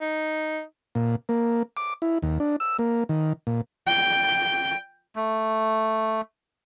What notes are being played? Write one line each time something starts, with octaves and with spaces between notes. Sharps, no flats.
D#4
A#2
A#3
D6
E4
D#2
D4
E6
A#3
D#3
A#2
G5
A3